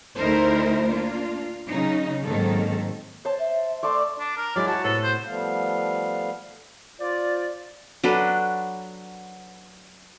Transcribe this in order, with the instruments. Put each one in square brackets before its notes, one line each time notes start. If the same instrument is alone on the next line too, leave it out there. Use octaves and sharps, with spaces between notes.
[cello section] D2 A3 D#4 E4 A#4 C5
A#3 D4 F4
C#3 F#3 D#4
G#2 D#3 F#3 A#3 C4 A4
[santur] C5 A5 [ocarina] C#5
[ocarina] E5
[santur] A3 D5 A5 [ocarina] C6
[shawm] D4
A#4
[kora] F#3 G#3 E4 [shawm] D5
[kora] F#4 C#5 [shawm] A5
[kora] A2 C3 B3 [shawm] A4
[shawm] C5
[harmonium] F3 G3 A3 B3 F5
[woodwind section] F4 C5 D5
[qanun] F#3 D4 A4 B4